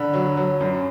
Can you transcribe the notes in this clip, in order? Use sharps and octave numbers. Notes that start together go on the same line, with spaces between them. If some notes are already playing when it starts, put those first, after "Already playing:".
Already playing: D3 B5
F#3
F#3
F#2